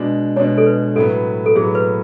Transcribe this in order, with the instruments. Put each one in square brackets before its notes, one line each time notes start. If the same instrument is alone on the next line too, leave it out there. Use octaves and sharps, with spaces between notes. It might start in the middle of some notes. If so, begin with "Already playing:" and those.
Already playing: [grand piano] B2 G#3 D4
[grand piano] B2 G#3 D4 [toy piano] C#5
[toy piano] A4
B4
[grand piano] A2 F#3 B3 [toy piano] A4
[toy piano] A4
[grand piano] A2 F#3 B3 [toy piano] G#4
[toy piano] B4